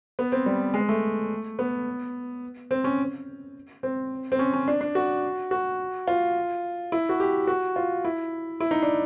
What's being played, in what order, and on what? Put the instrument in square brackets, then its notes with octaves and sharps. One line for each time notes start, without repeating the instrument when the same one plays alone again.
[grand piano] B3
C4
G3
G#3
A3
B3
C4
C#4
C4
C4
C#4
C#4
D4
D4
F#4
F#4
F4
E4
F#4
G4
F#4
F4
E4
E4
D#4
D4